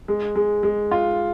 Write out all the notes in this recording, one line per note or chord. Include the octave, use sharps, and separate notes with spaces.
G#3
G#3
G#3
F4